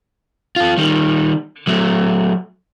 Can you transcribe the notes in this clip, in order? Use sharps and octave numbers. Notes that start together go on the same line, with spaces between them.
F4 A4
D#3 G3
F#3 A3